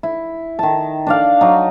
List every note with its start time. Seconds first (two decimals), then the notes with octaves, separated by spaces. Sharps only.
0.03 E4
0.59 D#3 A5
1.07 D4 D5 F5
1.41 F#3 D#4